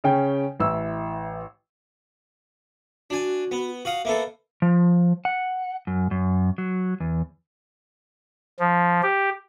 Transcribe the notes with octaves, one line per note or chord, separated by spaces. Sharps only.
C#3 C#4 G5
A1 E4 E6
D4 F#4 G#5
B3
F#4 F5 D#6
A#3 B3 A4 E5
F3
F#5
F#2
F#2
F#3
E2
F3
G4